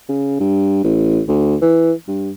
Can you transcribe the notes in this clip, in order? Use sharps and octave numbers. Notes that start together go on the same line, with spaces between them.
C#3
G2
A1
D2
E3
G2